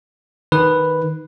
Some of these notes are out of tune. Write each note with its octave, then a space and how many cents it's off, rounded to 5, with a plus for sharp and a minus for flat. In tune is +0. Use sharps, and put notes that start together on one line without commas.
D#3 +5 B4 +0